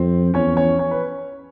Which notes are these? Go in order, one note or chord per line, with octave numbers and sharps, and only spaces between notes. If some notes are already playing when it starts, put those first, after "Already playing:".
Already playing: F2 C4 C5
E2 C#4 C#5
C#4 C#5
C#4 C#5
B4